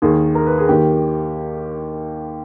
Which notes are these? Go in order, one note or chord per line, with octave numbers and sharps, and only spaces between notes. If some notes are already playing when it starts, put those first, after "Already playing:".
D#2 D#3 G#4
A#4
B4
G#4
D#2 D#3 G4